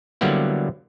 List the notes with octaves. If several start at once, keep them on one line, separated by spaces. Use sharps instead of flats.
D3 F#3 G3 A#3 B3 E4